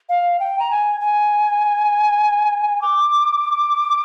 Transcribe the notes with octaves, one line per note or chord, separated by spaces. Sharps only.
F5
G5
A#5
G#5
G#5
D6